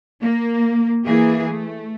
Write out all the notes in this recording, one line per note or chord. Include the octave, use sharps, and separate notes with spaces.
A#3
E3 A#3 G#4
A3